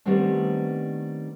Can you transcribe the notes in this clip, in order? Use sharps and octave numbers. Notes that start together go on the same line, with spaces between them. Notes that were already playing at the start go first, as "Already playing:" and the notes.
D#3 G3 A3 B3 C4 D4